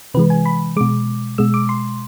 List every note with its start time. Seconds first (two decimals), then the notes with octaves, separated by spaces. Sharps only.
0.14 C3 E3 G#3 B4
0.30 G#5
0.46 B5
0.76 B2 G#3 D6
1.38 B2 G#3 E6
1.54 D6
1.69 C6